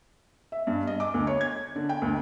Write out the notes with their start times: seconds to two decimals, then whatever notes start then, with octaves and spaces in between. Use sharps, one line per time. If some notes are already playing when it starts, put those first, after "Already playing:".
0.52 E5
0.67 G2
0.87 D#5
1.00 D6
1.14 D2
1.27 C#5
1.41 G#6
1.76 D3
1.89 G5
2.02 D2